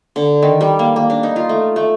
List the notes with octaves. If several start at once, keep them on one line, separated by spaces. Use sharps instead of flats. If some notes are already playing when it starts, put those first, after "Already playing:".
D3
D#3
G3
A#3
A#3
D4
D#4
F4
A3
A3